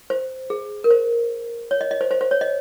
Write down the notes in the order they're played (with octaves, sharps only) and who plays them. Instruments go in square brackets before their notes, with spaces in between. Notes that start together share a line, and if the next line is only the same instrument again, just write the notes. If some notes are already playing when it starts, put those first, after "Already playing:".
[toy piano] C5
G#4
A#4
C5
C#5
D#5
D#5
C5
C5
C5
C#5
D#5